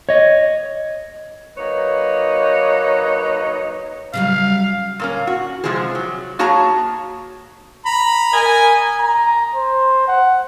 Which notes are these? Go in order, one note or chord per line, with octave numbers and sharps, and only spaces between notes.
C#5 D#5
F#3 A#3 D#4 B4 C#5
C#3 F#3 G3 F5
A#2 A#3 C#4
F#4
C3 F3 G#3 C4 G#4
F#3
A#3 F#4 G#4 C#5 A5 A#5
A#5 B5
A#4 D#5 G#5
A#5
C5
F#5